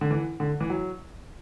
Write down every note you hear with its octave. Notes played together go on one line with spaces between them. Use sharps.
D3
E3
D3
E3
F#3